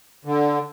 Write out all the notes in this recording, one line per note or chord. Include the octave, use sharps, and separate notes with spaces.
D3